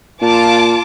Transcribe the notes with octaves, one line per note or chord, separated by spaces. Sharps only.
A#2 F4 A5 D6